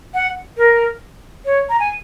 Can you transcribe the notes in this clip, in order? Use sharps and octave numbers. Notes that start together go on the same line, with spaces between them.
F#5
A#4
C#5
A#5
G#5